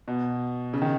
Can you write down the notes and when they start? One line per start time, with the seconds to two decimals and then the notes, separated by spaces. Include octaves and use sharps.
0.08 B2
0.74 C#3
0.82 D#3